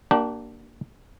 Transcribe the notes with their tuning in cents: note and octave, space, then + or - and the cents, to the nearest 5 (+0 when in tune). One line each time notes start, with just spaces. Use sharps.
A#3 +0 D4 +0 G4 -40